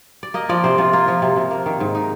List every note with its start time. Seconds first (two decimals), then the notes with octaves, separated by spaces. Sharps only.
0.23 D5
0.34 A#3 D#5
0.49 F3 D5
0.64 C3 C5
0.78 C3 F4
0.93 A#3 F4
1.08 F3
1.22 C3
1.36 C3
1.51 A#3
1.66 D#3
1.80 G#2
1.95 D#4